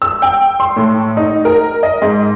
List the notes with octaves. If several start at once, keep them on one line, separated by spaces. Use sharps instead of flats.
E6
G5
C6
A2
D#4
A#4
D#5
G#2